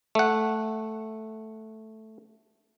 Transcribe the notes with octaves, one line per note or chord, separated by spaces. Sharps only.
A3 F#5